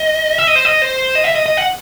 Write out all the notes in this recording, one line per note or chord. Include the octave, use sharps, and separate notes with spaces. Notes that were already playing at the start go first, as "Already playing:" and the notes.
Already playing: D#5
E5
D#5
C5
D#5
C5
D#5
E5
D#5
D#5
F#5